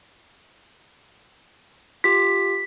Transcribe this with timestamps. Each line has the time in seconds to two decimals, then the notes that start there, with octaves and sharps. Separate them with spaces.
2.04 F4 G4 B6